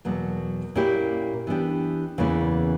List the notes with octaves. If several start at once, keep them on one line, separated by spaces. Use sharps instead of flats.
E2 B2 F#3 A#3
A#2 A#3 C#4 E4 G4
E3 B3 D4 G4
E2 C#3 E3 A#3 E4